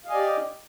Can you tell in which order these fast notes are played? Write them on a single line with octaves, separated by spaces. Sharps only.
F5 D#5 G#5 D5 G4